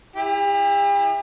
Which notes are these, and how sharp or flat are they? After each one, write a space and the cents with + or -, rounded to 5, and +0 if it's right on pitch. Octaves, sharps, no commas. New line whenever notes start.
E4 +0 G4 +45